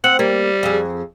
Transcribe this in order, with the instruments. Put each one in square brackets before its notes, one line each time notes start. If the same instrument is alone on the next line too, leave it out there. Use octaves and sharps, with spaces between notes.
[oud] C4 [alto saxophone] F#5
[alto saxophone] G3 [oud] A#3
[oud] F2 G#4